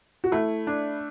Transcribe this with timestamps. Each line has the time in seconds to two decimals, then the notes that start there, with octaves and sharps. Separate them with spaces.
0.24 F#4
0.32 A3 E4
0.67 D4